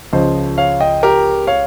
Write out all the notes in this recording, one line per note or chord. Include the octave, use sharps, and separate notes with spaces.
C#2 C#3 F3 C5 D#5
C#5 F5
D#5 G5
G4 A#4
C#5 F5